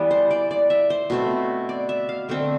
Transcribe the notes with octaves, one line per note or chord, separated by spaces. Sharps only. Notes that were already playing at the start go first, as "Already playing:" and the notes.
Already playing: E3 G3 B3
C5
D5
D5
E5
C5
B2 A3 C4
D5
E5
F5
D3 A3 C4